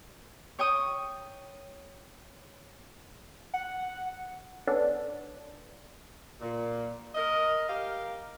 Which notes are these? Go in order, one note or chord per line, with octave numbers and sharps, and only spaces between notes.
C#5 G5 C#6 D#6
F#5
B3 C#4 D4 A4
A#2
A#4 D#5
G4 A#4 F5